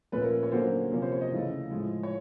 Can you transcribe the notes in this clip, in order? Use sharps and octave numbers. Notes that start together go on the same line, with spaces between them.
A#2 F3 A3 C#4 B4
A#4
C#5
D3 F#3 A#3 C#4 C5
C3 F3 A#3 C#4
C5
C#5
D#5
C#3 E3 A3
A2 F3 G#3
C#5